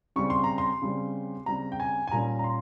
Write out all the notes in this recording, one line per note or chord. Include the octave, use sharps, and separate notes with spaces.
C#3 G3 C4 C#6
C6
A#5
C6
C#3 G3 C4
C#3 G3 C4 A#5
G5
G#5
G#5
A#2 G3 A#3 C#4 A#5
A#5
C6